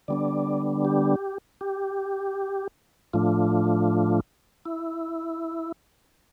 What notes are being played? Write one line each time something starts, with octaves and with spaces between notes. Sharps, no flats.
D3 G3 B3 D4 D5
G4
G4
A2 F3 A3 D4 F4
E4